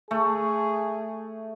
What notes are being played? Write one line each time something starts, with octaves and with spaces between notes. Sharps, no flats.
A3 G#4